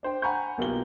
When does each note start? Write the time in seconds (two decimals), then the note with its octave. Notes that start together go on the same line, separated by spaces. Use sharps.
0.03 D4 C5 G5
0.22 F#5 G#5 A#5 B5 C#6 G6
0.58 B1 B2 A#3 F4 G4 G7